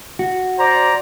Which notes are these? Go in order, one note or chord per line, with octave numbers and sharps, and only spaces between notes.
F#4
C5 D5 A#5